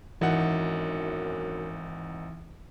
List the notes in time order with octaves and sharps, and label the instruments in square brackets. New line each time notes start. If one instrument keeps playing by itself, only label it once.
[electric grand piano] G#1 D#4 F#5 [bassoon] F#2 [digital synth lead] E3